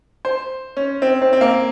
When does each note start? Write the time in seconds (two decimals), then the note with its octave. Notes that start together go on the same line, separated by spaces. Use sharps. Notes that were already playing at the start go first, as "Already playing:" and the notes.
0.25 C5
0.77 C#4
1.02 C4
1.22 C4
1.33 C4
1.41 A#3